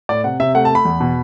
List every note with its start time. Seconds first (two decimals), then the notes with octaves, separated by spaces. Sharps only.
0.09 A2 D5
0.24 C3 F#5
0.40 C3 E5
0.55 A3 F#5
0.65 A5
0.70 A3 B5
0.85 E2
1.00 B2